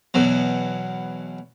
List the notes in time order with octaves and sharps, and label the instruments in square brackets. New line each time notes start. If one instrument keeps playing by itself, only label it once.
[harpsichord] E2 B2 F#3